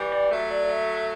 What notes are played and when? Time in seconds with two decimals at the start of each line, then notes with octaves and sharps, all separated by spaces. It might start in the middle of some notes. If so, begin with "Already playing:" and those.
Already playing: E3 G3
0.13 D5
0.31 F#3 A3 E5
0.50 D5
0.65 D5
0.69 E5